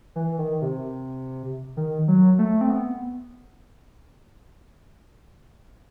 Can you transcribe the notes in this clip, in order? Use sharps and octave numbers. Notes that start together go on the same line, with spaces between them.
E3
D#3
C3
D#3
F#3
A3
C4
B3